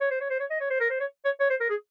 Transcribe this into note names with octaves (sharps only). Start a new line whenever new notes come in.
C#5
C5
C#5
C5
C#5
D#5
C#5
C5
A#4
C5
C#5
C#5
C#5
C5
A#4
G#4